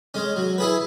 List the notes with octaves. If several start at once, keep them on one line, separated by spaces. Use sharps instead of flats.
G#3 C#4
F#3
E4 G#4 B4